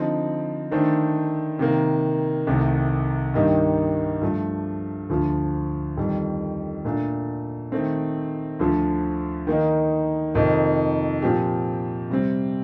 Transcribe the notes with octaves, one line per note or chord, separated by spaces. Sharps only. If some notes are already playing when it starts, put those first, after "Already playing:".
Already playing: D3 F3 C4 D#4
D#3 A3 D4 A4 C5
C3 D#3 A#3
C2 C3 D#3 A3
G2 D#3 A#3 D#4 G4
G2 F3 A3
D2 D3 F3
F2 D#3 G3
A#2 A3 D4
D#3 A3 C4
D2 D3 F3
D#3 A#3 D#4
F2 C3 D#3 A#3 D#4
A#2 F3 C4 G4
C3 G3 C4